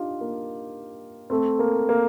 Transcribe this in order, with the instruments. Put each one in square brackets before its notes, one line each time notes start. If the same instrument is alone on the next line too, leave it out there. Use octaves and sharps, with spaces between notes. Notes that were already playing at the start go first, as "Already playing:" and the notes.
Already playing: [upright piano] D4 D#4 F4 G4
A#3
A3 C4
A#3
A#3